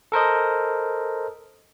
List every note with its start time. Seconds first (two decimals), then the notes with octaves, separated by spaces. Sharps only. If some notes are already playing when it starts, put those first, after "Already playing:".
0.12 A4 A#4 C5 D#5